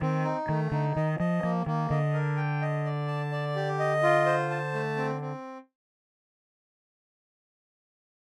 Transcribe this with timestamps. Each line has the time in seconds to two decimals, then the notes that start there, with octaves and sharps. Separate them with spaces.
0.01 D#3 C4
0.24 D#4
0.49 D#3 A3
0.72 D3 D#4
0.96 D#3 D#5
1.19 F3 D#5
1.42 F3 A#3
1.66 D#3 A#3
1.90 D3 D#5
2.14 A#4
2.37 G5
2.62 D#5
2.85 D5
3.08 A5
3.32 D5
3.56 G4
3.79 D#5
4.03 F4
4.26 C5
4.50 A5
4.74 A3
4.97 C4
5.21 C4